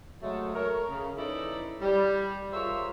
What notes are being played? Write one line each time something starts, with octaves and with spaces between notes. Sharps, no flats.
C3 F#3 G#3 A3
A4 A#4 C#5
C#3
E3 C#4 D#4 E4 A4 D5
G3
F4 G#4 A#4 C5 C#5 E5